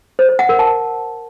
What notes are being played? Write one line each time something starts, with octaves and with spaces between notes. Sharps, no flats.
C5
C5
F#5
A#4
A5